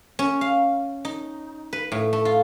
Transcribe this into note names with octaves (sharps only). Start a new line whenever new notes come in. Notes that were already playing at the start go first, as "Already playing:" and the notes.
C#4
F5
D#4
B4
A2
A3
F4